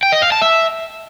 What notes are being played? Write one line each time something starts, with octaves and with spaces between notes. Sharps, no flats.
G5
D#5
F5
A5
E5